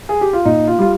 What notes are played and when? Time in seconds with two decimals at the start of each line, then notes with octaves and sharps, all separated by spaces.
0.09 G#4
0.21 G4
0.33 F4
0.45 A#2 D#4
0.67 F4
0.79 G3 F4